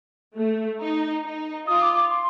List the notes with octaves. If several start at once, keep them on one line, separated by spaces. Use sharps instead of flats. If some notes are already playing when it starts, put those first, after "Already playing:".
A3
D#4
D#4
F4 D#6
D6
D6
C6